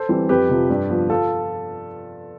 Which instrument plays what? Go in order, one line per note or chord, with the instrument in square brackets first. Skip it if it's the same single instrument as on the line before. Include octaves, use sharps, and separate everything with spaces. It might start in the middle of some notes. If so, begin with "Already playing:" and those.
Already playing: [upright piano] A4 C5
E3 G3 C4
F2 G4 B4
C3 F3
G2
F3 B3
F4 A4